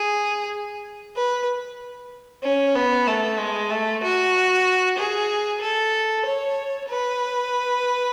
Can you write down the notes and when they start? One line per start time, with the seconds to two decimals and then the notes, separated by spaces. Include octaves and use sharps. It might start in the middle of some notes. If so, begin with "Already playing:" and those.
Already playing: G#4
1.16 B4
2.43 C#4
2.75 B3
3.07 A3
3.39 G#3
3.71 A3
4.03 F#4
4.98 G#4
5.61 A4
6.26 C#5
6.89 B4